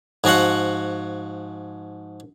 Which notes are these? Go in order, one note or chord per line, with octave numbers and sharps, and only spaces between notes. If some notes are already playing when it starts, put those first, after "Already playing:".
G#2 F3 F#4 F5 F#5